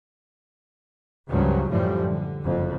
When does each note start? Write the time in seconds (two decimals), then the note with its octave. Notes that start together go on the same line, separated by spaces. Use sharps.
1.30 C#2 G2 C#3 F3 F#3
1.70 F#2 A2 D3 E3 F3 G3
2.07 D3
2.45 F#1 F2